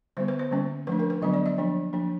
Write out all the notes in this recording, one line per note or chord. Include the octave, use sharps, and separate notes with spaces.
D3 G3 B3 C5
B4
C5
D3 G3 A#3 C#4
F3 A3 D4 B4
A#4
B4
D3 F#3 B3 D4 D#5
D5
D#5
F3 A#3 D4
F3 A#3 D4